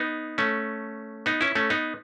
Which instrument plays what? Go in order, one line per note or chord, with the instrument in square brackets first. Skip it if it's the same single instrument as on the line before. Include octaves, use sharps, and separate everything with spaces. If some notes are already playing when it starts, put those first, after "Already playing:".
Already playing: [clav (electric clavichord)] B3 D#4
A3 C#4
B3 D#4
C#4 E4
A3 C#4
B3 D#4